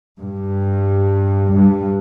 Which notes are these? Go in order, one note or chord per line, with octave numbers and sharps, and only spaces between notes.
G2
G2